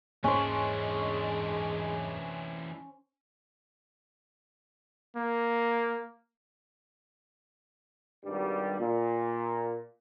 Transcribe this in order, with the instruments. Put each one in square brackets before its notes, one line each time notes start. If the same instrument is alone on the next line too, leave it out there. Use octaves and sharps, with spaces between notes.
[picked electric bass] E1 G#2 A#3 [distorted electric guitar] E3 D4 [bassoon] G#3 [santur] C#4 C5
[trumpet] A#3
[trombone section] G#1 G2 G3
A#2